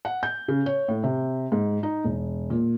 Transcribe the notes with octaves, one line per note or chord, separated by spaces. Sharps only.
F#5
G6
C#3
C#5
A2
C3
G#2
D#4
E1
A#2